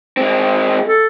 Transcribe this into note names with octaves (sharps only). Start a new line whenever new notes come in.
G#3 C4
A4